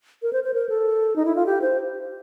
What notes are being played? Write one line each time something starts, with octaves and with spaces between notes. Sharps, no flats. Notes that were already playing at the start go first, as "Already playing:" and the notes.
A#4
C5
C5
A#4
A4
D#4
E4
F4
G4
C5